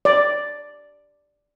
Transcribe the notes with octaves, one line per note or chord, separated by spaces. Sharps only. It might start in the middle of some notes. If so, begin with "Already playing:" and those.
D5